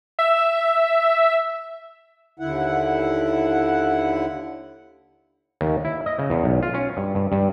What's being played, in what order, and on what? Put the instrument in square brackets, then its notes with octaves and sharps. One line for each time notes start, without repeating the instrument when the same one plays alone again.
[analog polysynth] E5
[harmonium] D#2 D3 E4 F#5
[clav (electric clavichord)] D#2
E4
D#5
C#3
E2
B1
F4
C#4
G2
G2
G2